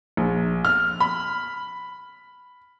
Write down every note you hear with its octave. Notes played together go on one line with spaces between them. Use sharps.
A#1
F6
B5